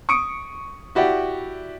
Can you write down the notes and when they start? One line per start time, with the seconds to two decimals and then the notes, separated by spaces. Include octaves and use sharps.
0.09 C#6 D#6 C#7 D7
0.95 E4 F#4 G4 D5